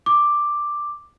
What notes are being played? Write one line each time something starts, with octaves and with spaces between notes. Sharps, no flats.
D6